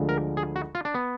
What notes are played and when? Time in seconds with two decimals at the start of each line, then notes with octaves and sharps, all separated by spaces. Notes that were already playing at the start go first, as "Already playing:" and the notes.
Already playing: D2 D3 F3 G#3
0.09 A#4
0.37 G#4
0.56 F#4
0.75 F4
0.85 D4
0.94 B3